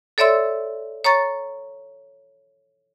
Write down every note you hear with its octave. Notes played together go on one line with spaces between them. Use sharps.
A4 C#5 D5 E5 C6 E6
C#5 A#5 C#6 A6